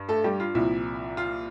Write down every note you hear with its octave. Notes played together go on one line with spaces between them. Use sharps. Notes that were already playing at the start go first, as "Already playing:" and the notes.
Already playing: G2
A3 A4
G3 G4
F4
C2 A#2 F3 E4
F4